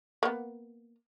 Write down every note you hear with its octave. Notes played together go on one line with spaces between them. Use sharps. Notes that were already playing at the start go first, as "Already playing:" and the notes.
A#3 B3